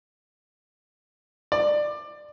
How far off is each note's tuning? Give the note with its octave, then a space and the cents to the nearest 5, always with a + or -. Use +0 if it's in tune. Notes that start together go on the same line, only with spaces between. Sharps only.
D5 +20